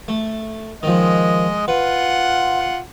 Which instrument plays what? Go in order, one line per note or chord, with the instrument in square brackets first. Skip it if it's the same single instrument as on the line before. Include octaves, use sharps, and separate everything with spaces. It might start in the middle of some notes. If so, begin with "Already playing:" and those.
[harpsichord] A3
[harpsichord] D#3 F3 [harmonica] G#3 D#5
[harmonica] F4 F#5 [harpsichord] B4